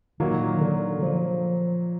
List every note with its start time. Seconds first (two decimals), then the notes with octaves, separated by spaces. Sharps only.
0.20 A#2 D#3 F#3 A#3
0.61 D3
1.03 F3